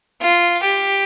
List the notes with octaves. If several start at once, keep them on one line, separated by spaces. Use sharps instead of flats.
F4
G4